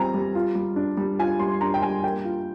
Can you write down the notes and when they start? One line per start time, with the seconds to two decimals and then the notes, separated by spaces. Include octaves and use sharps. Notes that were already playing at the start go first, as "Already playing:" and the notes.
Already playing: G3 C4 F4 G#5 A#5
0.14 G3
0.35 F4
0.55 G3
0.76 D4
0.97 G3
1.19 F4 G#5
1.39 G3 C6
1.61 D4 A#5
1.74 G5
1.82 G3 G#5
2.03 A#3 G5
2.25 F4